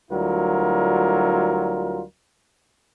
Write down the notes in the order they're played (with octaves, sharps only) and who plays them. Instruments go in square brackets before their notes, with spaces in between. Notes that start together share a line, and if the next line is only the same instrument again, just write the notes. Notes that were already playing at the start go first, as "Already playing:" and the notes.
[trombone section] D2 F#3 G3 E4 F4 A#4